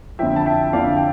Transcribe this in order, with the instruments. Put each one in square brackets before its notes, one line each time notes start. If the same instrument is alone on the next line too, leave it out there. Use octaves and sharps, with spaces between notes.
[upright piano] F2 D3 F3 E5 G5
A5
E5 G5
F2 D3 F3 D5 F5
G5